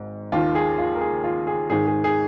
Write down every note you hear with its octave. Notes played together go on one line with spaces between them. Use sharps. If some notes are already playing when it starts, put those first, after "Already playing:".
Already playing: G#1 G#2
D#2 D#3 F4
G#4
F4
A#4
G#4
F4
G#4
G#1 G#2 D#3 G#4
G#4
G#4